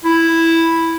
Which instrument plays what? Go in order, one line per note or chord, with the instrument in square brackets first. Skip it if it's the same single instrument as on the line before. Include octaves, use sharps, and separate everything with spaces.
[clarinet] E4